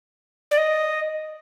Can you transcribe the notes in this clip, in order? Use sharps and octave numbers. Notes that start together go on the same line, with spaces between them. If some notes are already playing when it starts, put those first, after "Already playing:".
D5
D#5